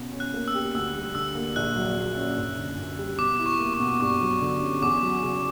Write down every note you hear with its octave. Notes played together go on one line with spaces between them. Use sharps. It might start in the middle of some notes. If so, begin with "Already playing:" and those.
Already playing: B2 C#4
C#4
F#6
A#3
E6
G4
D2 E6
G3
D3 E6
A#3
A#1 F#6
F#3
A#2
C#4
F#1
D3
F#2
G3
B2 D6
E4
C#6
A#3
C#6
B2
G2 C#6
F#3
D3
C#4
E2 D6
F#3
C#3